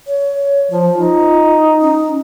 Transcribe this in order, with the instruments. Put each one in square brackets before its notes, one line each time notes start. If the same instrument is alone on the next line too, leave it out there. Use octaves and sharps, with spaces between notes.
[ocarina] C#5
[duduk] F3 [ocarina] F4
[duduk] D#4
[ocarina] C#4